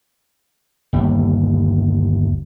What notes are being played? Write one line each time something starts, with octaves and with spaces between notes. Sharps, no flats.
G1 D#2